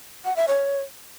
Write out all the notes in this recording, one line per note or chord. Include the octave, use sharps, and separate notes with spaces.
F#5
E5
C#5